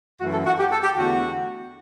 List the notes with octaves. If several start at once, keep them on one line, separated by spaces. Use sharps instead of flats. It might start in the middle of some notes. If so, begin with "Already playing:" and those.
F#2 E3 A3 F#4
A4
F#4
G4
A4
G4
E2 D3 A3 F#4